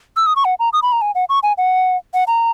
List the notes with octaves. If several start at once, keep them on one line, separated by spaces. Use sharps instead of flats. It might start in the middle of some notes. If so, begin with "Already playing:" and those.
E6
D#6
C#6
F#5
A#5
D#6
B5
A#5
G#5
F#5
C#6
G#5
F#5
F#5
A#5